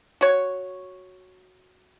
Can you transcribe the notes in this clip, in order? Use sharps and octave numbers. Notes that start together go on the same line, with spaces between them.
F#4 C#5